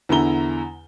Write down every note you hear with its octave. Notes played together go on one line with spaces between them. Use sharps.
E2 D3 E4 A#5 G7